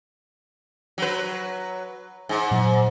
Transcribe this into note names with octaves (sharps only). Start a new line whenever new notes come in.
F#3 B4
G#2
A#2 F#3